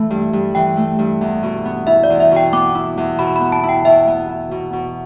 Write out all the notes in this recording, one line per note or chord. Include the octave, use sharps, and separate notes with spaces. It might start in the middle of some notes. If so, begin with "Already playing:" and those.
Already playing: E3 A3
G2
G2
E3 G5
A3
G2
E2
B2
B3
E4 E5
D5
E2
E5
B2
G5
B3 D6
E4
E2
B2 B5
B5
B3
A5
E4
G5
B2 E5
B3
E4
B2
B2